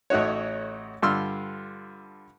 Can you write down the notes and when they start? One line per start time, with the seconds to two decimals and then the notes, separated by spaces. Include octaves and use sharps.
0.10 A1 A3 D#4 F#4 C#5
1.02 G2 D3 F4 C6 E6 F6